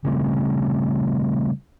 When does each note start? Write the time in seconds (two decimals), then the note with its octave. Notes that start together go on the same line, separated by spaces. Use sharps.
0.05 C#3 G3 A3 C4